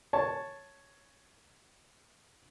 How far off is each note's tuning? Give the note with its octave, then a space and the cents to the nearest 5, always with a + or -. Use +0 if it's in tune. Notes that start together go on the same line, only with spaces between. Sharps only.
C#5 +0 A5 +0